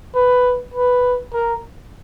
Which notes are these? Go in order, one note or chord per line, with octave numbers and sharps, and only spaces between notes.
B4
B4
A#4